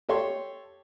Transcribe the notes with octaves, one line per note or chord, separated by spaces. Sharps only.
G4 A4 C#5 C6